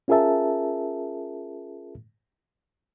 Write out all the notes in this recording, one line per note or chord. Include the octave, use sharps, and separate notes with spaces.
C#4 F4 G#4 A#4 E5 A5